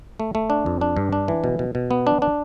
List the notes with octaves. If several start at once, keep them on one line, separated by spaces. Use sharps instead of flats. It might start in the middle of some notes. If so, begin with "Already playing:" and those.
A3
A3
D4
F2
D4
G2
D4
E3
B2
B2
B2
B3
D4
D4